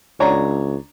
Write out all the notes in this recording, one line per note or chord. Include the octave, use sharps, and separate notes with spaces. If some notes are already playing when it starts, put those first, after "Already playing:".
C#2 D4 C#5 A#5